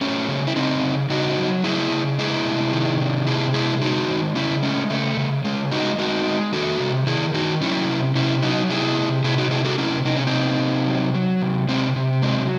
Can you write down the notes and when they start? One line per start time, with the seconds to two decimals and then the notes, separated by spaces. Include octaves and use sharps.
0.01 F#3 A3 C#4
0.28 C#3
0.47 E4
0.56 C#3 C4 D#4
0.84 C#3
1.10 C#3 D#4 F#4
1.38 F#3
1.64 C#3 E4 G#4
1.91 C#3
2.18 G#3 E4 G#4
2.45 C3
2.73 D#3
3.00 C3
3.27 C3 E4 G#4
3.54 G#3 E4 G#4
3.81 G#3 D#4 F#4
4.08 D#3
4.35 C#3 C#4 E4
4.63 G#3 A3 C#4
4.90 C#3 A3
5.17 C#3
5.44 C#3 G#3
5.71 G#3 D#4 F#4
5.98 G#3 D#4 F#4
6.26 G#3
6.52 D#3 F#4 A4
6.80 C3
7.07 D#3 E4 G#4
7.34 D#3 D#4 F#4
7.61 F#3 C#4 E4
7.88 C3
8.15 C3 C#4 E4
8.42 F#3 D#4 F#4
8.70 C3 E4 G#4
8.97 C3
9.24 C3 E4 G#4
9.38 D#4 F#4
9.51 C3 E4 G#4
9.65 F#4 A4
9.78 C3 C#4 E4
10.05 C3 D#4
10.16 C#4
10.27 C4 D#4
10.33 C3
10.59 C3
10.87 F#3
11.14 F#3
11.41 C3
11.68 C3 G#3 C4
11.96 C3
12.22 F#3 G#3 C4